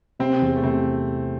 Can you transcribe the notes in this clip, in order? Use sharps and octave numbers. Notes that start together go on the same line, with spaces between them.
C3 C4
E2
A3
C3 C4